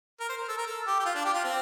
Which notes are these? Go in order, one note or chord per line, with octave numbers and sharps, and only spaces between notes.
A#4
C5
A#4
A4
A#4
A4
G4
G4
F4
D4
G4
F4
C4